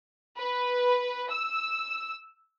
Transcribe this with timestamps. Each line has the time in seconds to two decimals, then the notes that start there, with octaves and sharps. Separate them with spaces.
0.38 B4
1.31 E6